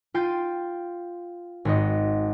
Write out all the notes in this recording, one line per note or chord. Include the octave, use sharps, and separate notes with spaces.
F4 G5 C6 A6 D#7
G#1 F#4 D#5